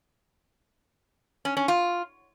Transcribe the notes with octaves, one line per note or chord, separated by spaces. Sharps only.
C#4
C#4
F4